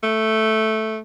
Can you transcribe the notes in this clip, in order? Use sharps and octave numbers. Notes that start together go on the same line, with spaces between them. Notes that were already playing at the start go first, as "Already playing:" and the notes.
A3